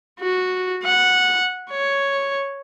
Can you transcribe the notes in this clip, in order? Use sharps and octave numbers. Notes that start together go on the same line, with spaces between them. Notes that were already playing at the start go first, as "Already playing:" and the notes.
F#4
F#5
C#5